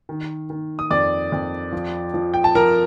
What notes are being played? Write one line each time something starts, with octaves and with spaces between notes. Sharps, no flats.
D#3
D#3
D#6
F2 D5 D6
F2
F3
F3
G5
A5
F3 A#4 A#5